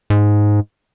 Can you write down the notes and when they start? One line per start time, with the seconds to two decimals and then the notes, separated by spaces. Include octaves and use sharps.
0.10 G#2